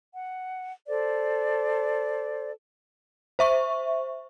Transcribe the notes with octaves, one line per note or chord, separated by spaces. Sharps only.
F#5
A4 C5 D5
C5 E5 C#6